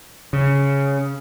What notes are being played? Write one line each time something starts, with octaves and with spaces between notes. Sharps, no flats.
C#3